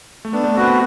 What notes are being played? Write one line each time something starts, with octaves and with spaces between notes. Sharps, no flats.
A3
B3 D4
A3
C4 F#4 B4
B3